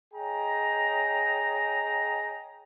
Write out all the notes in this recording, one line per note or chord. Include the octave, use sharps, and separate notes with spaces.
G#4 C#5 D#5 G5 A#5